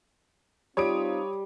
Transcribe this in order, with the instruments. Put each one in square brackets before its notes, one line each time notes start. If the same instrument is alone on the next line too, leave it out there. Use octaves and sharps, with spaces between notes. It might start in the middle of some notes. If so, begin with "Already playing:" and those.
[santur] G3 [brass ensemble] C4 D#4 F4 [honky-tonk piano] C#5 D#6 D7